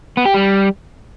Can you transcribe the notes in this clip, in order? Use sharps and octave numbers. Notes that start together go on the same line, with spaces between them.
B3
G4
G3